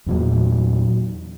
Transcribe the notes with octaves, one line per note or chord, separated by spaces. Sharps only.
E2 A#2 F#3